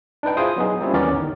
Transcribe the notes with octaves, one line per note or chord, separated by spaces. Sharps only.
D4 D#4 B4 G5
E4 F4 G#4 C5 C6 D#6
F#3 B3 D#4 G#4
G3 A#3 C4 C#4 E4 F4
D#2 E3 B3 C#4 A#4 D5
G1 D#3